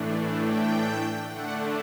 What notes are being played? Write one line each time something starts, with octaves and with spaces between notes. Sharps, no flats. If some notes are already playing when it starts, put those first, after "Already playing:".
Already playing: A2 E3 A3 D4
G5
D3 A3 D4 F#5